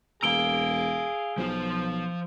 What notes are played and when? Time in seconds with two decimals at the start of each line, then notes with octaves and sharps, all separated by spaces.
0.23 E1 G#4 F5 A#5 E6 D7 G7
1.38 B1 F3 F4